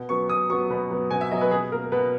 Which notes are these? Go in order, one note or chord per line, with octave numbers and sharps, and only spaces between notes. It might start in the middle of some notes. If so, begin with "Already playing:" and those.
Already playing: B2
F#3 B3 C#6
B2 D#6
F#3 B3 C#6
B2 B5
F#3 B3
B2 G#5
E5
F#3 B3 D#5
B4
B2 G#4
A#3 A#4
B2 B4